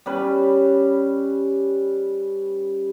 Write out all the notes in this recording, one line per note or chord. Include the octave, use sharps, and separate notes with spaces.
G3 C#4 B4